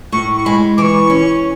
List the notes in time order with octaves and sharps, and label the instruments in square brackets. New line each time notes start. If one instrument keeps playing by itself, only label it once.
[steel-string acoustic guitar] A2 [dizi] C#6
[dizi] C#6
[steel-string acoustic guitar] G#3 [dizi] B5
[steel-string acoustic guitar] E3 [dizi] C#6 D6
[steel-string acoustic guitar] C#4